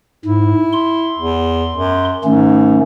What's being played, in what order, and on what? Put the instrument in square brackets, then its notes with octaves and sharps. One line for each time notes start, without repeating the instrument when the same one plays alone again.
[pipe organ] G#2 [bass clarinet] E4
[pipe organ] C6
[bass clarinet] E2
F#2
[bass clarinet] G#2 [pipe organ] D#3 A3 C#4